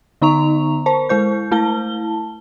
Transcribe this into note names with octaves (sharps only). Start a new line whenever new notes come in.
D3 B3 D#4 A#5 C#6 F7
A#4 C5 A5
G#3 E4 C5 G6
A3 E4 A5 G7